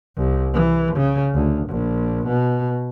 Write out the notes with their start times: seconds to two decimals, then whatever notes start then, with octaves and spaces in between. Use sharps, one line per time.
0.17 C2
0.53 E3
0.96 C#3
1.34 D2
1.68 A#1
2.26 B2